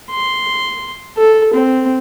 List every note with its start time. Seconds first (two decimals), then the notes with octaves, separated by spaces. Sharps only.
0.11 C6
1.18 A4
1.53 C4